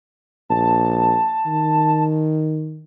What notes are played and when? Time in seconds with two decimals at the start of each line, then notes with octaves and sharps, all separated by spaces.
0.50 A#1 A5
1.47 D#3